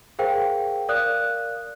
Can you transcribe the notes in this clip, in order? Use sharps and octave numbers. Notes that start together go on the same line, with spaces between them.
G#4 A#4 C5 F5 G5
A#4 D5 F5 D#6 F#6